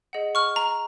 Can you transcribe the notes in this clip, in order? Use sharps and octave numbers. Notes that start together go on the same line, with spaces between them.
G#4 D#5 F#5
C#6 F6
A#5